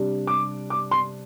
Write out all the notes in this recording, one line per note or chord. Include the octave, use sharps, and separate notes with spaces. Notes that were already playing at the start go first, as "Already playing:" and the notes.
Already playing: C3 G3 D4
D6
D6
C6